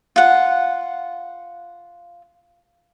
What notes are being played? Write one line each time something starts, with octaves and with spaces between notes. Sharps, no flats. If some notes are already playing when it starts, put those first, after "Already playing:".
F4 F#5